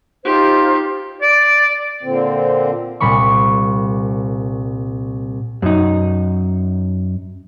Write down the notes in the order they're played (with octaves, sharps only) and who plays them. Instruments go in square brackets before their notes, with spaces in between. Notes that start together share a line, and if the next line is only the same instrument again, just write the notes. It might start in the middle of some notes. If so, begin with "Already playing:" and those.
[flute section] D#4 F4 C5 [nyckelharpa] G4
[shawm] D5
[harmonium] A#2 D3 C4
[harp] C2 A#2 G3 B5 C#6
[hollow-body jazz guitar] F#2 D#4